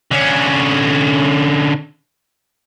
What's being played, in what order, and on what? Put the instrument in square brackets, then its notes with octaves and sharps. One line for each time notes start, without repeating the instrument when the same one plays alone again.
[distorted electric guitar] D3 C#4